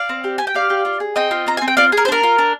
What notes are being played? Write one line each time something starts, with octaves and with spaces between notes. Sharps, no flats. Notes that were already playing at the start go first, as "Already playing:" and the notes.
Already playing: D5 F5
C4
G4
G4 G#5
G5
G4 D5 F5
G4
F4
G#4
C4 D#5 G5
F4
C4 A#5
C4 G#5
G5
F4 D5 F5
G#4
A#4
C5
D4 A#4
F4
D4